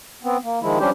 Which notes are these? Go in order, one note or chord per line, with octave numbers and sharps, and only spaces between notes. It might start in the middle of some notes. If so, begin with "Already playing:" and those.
B3 C4
A#3
D#3 F3 G#3 E4
F3 G3 C#4 D4 G4 C5